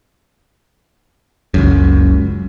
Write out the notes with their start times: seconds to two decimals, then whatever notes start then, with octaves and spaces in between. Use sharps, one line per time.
1.54 F#1 C#2 F#2